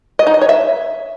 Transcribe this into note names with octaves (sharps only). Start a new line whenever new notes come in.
D#5
D#4
D#5
C#5
E5